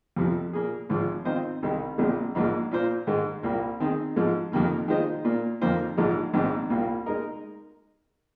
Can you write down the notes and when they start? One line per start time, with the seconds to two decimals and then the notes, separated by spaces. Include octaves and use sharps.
0.16 F2 C3 F3
0.53 A#2 A#3 G#4
0.90 G#1 G#2 F3
1.25 D#3 C4 F4 C5 D#5
1.63 C2 C3 D#3 G#3 D#4
1.98 A#1 A#2 G#3 C4
2.35 A#1 G#2 F3 A#3 D#4
2.71 A#2 A#3 F4 C5
3.07 G#2 D#3 G#3
3.43 C2 A#2 A#3
3.80 D#3 C4 D#4 G#4
4.16 G#2 F3 G#3
4.52 F2 C3 D#3 A#3 F4
4.88 D#3 G#3 F4 C5 D#5
5.25 A#2 A#3 F4
5.61 F2 D#3 A#3 F4 C5
5.97 A#1 G#2 F3 G#3 D#4
6.33 A#1 G#2 D#3 C4
6.70 C2 A#2 A#3 F4
7.06 G#3 D#4 A#4 D#5